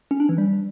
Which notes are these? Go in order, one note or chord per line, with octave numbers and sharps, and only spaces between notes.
C#4
D4
E3
G3